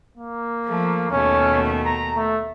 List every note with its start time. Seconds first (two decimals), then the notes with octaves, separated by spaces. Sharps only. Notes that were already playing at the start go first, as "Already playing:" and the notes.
0.17 A#3
0.66 F3 A3
1.11 D#2 B2 A3 C#4
1.86 A#5
2.16 A3